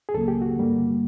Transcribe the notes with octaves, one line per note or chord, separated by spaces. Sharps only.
G#4
C#2 C#3 F#3 A#3 A4
G4
F#4
G2 D3 G3 A#3